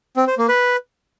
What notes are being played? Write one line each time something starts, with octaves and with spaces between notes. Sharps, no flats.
C4
C5
A#3
B4